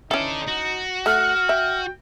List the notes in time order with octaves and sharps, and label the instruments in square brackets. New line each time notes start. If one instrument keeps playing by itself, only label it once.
[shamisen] E3 C#4 [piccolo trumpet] D#4 [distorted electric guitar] A4 D5
[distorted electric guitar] F#4
[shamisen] A3 [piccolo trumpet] F#5 [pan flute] F6
[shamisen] E5 [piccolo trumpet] G5